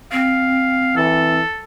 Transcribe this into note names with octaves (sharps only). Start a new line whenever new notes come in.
C4 F5
E3 A4